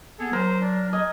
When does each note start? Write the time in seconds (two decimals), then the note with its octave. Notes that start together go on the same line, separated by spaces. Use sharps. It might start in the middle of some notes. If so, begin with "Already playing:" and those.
0.19 B3 G#4 A4
0.33 F#3 A#4 C5
0.61 D4
0.93 D#5 G#5